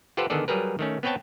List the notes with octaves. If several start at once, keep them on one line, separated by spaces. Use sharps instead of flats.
F4 G4 A4 B4 C5 F#5
D3 D#3 B3 G#4 A4 D5
F#3 G3 G#4 A#4 B4
D#3 A3 C#4
B3 C4 B4 C#5 G5 A5